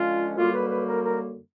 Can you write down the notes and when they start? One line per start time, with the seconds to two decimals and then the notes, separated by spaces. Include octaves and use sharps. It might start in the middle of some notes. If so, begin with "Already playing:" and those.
Already playing: D3 F3 G#3 C#4 F4
0.36 F#2 D3 G3 A#3 F4
0.53 B4
0.70 B4
0.87 A#4
1.04 A#4